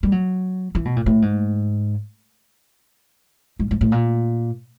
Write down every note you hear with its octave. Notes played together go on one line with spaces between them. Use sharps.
G3
F#3
E3
B2
A#2
A2
G#2
G#2
G#2
A2
A#2